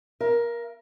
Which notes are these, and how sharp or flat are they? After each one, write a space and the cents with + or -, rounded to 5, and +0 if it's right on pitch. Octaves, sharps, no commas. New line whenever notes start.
A#4 +15 F5 -40